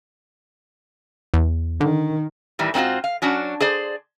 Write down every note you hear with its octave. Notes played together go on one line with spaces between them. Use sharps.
E2
D3 D#3
A2 D#3 E3 G3
G#2 C4 C#4 F4 F#4
F5
F#3 C#4 D4 F#4
G#4 C5 D5